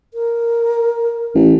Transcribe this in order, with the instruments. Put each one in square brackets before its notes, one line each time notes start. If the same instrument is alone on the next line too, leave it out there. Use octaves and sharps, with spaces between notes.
[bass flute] A#4
[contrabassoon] A1